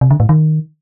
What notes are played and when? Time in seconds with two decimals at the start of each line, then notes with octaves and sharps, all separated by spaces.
0.01 C3
0.11 D3
0.20 A2
0.29 D#3